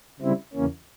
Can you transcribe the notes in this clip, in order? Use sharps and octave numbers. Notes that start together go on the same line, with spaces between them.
C#3 G3 C4 E4
E2 C#3 E3 A#3 C#4